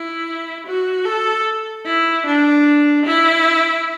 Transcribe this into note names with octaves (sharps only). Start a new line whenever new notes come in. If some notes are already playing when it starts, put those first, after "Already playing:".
Already playing: E4
F#4
A4
E4
D4
E4